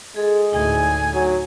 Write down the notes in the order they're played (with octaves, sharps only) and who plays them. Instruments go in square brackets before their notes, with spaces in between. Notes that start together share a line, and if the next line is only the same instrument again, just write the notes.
[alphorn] G#3 [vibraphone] G#4 A4
[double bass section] D2 A2 [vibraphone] D#4 [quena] G#5
[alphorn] F#3